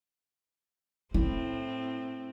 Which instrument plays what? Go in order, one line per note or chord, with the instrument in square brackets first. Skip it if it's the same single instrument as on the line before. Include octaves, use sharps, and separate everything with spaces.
[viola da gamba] A2 C4 [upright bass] E4